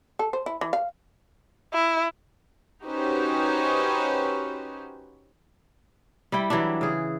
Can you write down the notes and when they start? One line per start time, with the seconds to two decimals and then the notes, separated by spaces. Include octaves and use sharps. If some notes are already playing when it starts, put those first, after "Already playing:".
0.19 A4
0.33 C5
0.46 E4
0.61 E3
0.73 F5
1.73 E4
2.85 C#4 D#4 F#4 G4 B4 C5
6.32 G3 E4 G5
6.50 E3 F#3 G3 D4
6.81 C#3 G#4